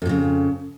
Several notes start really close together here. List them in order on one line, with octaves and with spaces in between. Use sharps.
F2 A#2 C#3